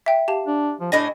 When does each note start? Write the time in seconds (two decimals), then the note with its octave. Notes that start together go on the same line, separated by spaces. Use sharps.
0.06 E5 G5
0.28 G4 F5 A5
0.47 D4
0.80 F3
0.92 A2 D4 D#5 G#5 A#6